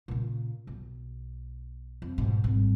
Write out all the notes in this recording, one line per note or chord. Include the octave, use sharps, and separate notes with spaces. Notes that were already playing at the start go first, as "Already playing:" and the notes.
A#2 C#3
B1
F2
G#2 B2
G#1 G2